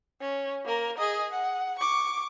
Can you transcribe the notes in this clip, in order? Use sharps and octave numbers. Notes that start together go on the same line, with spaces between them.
C#4
A#3 A#4
G#4 D#5
F#5
C#6 D6